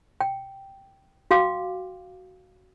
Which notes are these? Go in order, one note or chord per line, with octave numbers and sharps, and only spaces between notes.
G5
F#4 F5 G5 D6